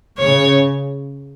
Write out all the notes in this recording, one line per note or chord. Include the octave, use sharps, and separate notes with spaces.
C#3 C#5